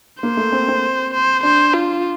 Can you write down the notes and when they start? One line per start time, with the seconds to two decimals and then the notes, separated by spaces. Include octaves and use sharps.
0.22 A#3 C5
0.37 A3
0.52 C4
0.68 C4
1.14 C5
1.43 D4 C5
1.73 F4